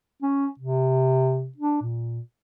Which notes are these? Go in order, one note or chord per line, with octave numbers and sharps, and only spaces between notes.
C#4
C3
D4
A#2